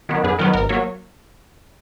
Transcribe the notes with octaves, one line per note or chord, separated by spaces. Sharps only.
D#3 F#3 B3
F#2 G#4 B4
D#3 F#3 B3 A#4
G#1 A#4
F#3 A#3 A#4 C#5